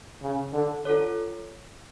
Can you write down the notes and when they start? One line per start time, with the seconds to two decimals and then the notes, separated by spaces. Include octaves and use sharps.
0.22 C#3
0.53 D3
0.85 D3 F4 A4 C#5